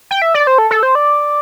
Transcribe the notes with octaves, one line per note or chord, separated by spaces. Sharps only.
G5
E5
D5
C5
A4
A4
C5
D5